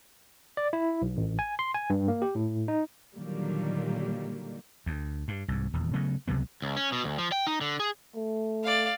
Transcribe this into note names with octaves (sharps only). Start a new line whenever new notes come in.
D5
E4
B1
A1
G#5
C6
G#5
G2
A#3
G4
A2
D#4
A#2 D3 D#3 F#3 G3 A#3
D2
G2
C2 G#2
D#1 E2
C#3 F#3 A3 B3
C#2 C3 F#3 B3
C#2
C#4
B2
D2
F3
G5
D#4
D3
G#4
A3
D5 F5